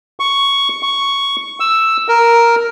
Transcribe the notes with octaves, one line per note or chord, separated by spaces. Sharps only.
C#6
C#6
E6
A#4